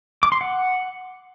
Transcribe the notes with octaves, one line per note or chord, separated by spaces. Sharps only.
D6
C6
F#5